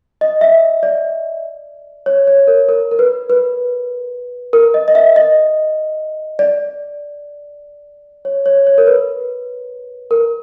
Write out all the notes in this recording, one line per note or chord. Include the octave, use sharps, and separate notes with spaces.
D#5
E5
D5
C#5
C#5
A#4
A#4
A#4
B4
B4
A#4
D#5
D#5
E5
D#5
D5
C#5
C#5
C#5
A#4
B4
A#4